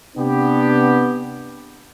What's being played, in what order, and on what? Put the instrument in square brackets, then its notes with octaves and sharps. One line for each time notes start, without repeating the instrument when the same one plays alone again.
[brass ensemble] C3 B3 D4 G4